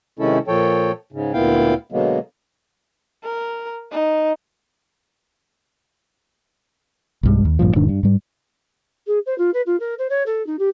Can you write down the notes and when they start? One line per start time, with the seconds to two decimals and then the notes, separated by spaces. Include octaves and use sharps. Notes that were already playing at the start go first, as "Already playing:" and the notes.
0.19 C3 D#3 G#3 C#4 E4 A4
0.48 A#2 F3 A4 C#5 G5
1.12 G#2 C#3
1.33 D2 A#2 B3 E4 F5 G5
1.92 B2 D3 F#3 G#3 A#3 B3
3.24 A#4
3.92 D#4
7.23 B1 G2 G#3
7.45 D#2
7.59 A#1 G2 A#2 F3
7.75 E1 G#2 D#3 D4
7.88 G2
8.03 G#2 G3
9.07 G#4
9.26 C5
9.38 F4
9.54 B4
9.66 F4
9.80 A#4
9.98 C5
10.10 C#5
10.26 A4
10.46 D#4
10.59 G4